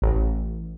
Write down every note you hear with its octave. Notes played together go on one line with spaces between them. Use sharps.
A1